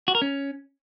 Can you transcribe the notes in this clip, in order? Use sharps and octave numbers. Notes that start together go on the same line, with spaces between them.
F#4
A#4
C#4